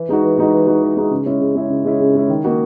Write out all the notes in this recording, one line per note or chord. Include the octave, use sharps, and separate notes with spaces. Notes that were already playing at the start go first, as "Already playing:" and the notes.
Already playing: E3
G#3 D#4 F#4
E3
G#3 D#4 F#4
E3
G#3 D#4 F#4
E3
G#3 D#4 F#4
C#3
G#3 C#4 E4
C#3
G#3 C#4 E4
C#3
G#3 C#4 E4
C#3
G#3 C#4 E4
D#3
A#3 D#4 F#4